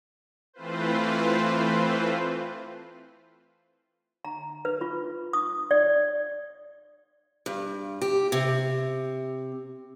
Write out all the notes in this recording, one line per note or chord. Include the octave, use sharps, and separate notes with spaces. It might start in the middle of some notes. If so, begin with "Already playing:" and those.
E3 A3 C4 F4 B4 C5
A#5
B4
F4
D#6
D5
G2
G4
C3